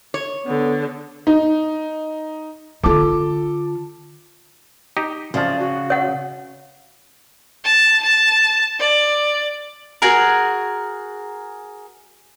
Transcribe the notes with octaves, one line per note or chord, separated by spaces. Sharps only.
C#5
D3 B3
D#4
D3 F4 A4 D6
D#4 G4
F#2 C#3 F3 D5
F#4
C#5 F#5
A5
A5
D5
F#4 G#4 A#4